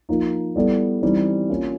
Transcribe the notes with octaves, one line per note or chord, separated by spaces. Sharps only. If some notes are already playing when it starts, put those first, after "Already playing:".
F3 A#3 D#4
G3 B3 E4 A4 D5
E3 G3 C4 D#4
A#3 C#4 F4